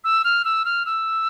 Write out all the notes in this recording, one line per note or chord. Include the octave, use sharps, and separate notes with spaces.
E6
F6
E6
F6
E6